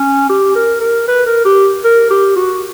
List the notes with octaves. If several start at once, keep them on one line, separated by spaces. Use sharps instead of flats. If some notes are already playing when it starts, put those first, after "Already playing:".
Already playing: C#4
G4
A#4
A#4
B4
A#4
G4
A#4
G4
F#4